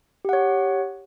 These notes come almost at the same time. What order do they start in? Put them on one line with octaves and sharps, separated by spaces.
G4 F#5 C#5